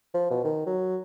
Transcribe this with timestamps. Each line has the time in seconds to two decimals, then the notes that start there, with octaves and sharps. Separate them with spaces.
0.14 F3
0.30 B2
0.45 D#3
0.66 F#3